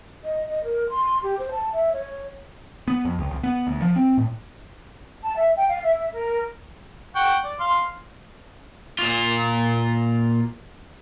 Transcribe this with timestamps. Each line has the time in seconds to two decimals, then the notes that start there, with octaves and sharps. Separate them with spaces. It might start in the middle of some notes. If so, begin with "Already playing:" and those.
0.24 D#5
0.49 D#5
0.64 A#4
0.90 C6
1.23 G4
1.39 C5
1.51 A5
1.73 E5
1.93 C#5
2.88 B3
3.05 F2
3.18 C#2
3.31 C2
3.43 B3
3.67 D2
3.82 F3
3.96 C4
4.17 A2
5.23 A5
5.36 E5
5.57 G5
5.68 F5
5.83 E5
6.12 A#4
7.15 F#5 G5 C#6
7.44 D5
7.60 F5 C6
8.99 A#2 F4